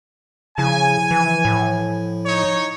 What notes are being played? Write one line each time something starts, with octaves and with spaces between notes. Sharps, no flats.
C#3 F3 E4 G#5
E3
A2
D#4 C#5